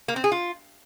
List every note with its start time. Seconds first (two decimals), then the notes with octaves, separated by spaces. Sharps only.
0.08 A#3
0.16 C4
0.24 G#4
0.32 F4